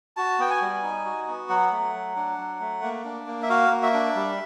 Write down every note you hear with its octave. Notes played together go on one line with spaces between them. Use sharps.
F#4 A5
B3 G5
G#5
G3
D#4
F#4
B3
F#3 F#5
A3
F#3
D4
F#3
A3
A#3
D4
A#3
E5
F#4 F5
A#3
E5
D4
G3